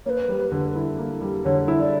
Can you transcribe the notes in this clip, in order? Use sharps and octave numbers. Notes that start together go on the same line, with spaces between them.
A#3 B4 C#5
G3
D3
E4
A#3
G3
D3 C#5
E4
D5